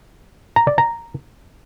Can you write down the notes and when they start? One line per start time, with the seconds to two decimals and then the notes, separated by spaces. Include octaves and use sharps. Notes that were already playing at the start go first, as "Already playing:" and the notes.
0.56 A#5
0.67 D5
0.78 A#5